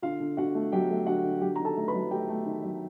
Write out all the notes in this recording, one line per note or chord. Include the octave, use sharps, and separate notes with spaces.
D3 F4 F5
D3
D3 F#4 F#5
A3
F#3 G4 G5
A3
D3 F#4 F#5
D3
F#3 G4 G5
D#3 A#5
A4 A5
A3
B4 B5
F#3
A3 G4 G5
A3
D#3
F#3